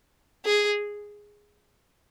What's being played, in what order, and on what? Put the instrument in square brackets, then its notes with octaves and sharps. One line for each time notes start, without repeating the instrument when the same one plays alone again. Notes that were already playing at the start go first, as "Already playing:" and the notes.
[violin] G#4